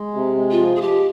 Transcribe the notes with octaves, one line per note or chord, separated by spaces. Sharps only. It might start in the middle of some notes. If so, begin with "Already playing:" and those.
Already playing: G#3
C3
G#3
F4
F3
G#4
F3 G4